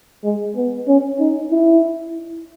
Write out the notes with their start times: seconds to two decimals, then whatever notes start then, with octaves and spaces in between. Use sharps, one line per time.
0.24 G#3
0.56 B3
0.88 C#4
1.20 D#4
1.51 E4